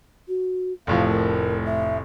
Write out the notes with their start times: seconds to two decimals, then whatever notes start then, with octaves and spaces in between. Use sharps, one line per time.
0.28 F#4
0.87 F1 A2 F3 F5
1.10 A#4
1.66 E5